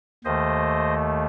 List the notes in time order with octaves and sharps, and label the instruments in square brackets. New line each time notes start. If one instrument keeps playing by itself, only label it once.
[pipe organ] D#2 D#3 A3 C5 D#5